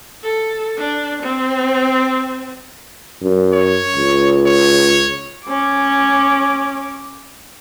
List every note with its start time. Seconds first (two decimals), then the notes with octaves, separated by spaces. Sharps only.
0.24 A4
0.77 D4
1.23 C4
3.23 F#2
3.53 C#5
3.96 C#2
4.47 C#5
5.45 C#4 D6